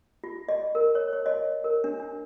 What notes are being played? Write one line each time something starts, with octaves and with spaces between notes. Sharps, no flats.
F4
D#5
A#4
C#5
C#5
D#5
A#4
D4
D4